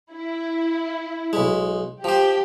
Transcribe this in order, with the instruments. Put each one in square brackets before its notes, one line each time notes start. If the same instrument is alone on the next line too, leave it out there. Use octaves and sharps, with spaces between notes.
[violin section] E4
[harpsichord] B1 G#3
[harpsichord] F3 C5 [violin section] G4